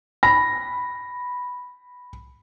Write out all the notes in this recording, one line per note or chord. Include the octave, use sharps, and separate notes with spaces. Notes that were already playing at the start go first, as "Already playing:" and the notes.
B5 A#6